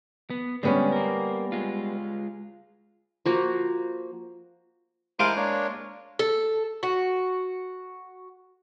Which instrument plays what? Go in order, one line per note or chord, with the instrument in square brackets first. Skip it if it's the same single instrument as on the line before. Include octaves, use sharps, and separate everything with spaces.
[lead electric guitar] B3
[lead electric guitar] D3 G#3 [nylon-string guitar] G3 B3 C#4
[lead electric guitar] A#3 A#4
G#3 F4
[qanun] F3 A#3 F#4
[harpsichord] G#3 F4 D6 [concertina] E4 A#4 C5
[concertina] A#3 D4 C#5
[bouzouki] A4
F#4